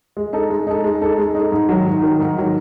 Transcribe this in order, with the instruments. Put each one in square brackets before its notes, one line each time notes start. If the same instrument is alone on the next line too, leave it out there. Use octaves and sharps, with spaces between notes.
[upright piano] G#3
D#4 A4
G#3
D#4 A4
G#3
D#4 A4
G#3
D#4 A4
G#2
D#3 F#3
G#2
D#3 F#3
G#2
D#3 F#3